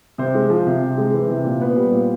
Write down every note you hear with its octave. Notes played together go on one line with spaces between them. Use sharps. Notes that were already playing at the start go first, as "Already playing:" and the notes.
C3 C5
G#3
F3
C3
C3
G#3
E3
C3
A#2
B3
G3
A#2